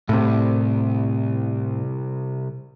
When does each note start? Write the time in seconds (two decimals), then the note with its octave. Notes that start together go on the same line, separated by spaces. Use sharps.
0.09 C2 A2 C3